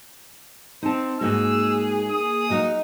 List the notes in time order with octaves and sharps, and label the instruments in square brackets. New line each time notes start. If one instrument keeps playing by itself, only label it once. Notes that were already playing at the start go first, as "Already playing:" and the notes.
[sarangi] C4 [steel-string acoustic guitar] D#4 A5
[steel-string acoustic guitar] G#2 D#4 F#4 [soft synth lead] A#3 [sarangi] G#4 [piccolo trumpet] E6
[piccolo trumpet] D#6
[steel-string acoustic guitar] F#3 F#4 F5 [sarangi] D#4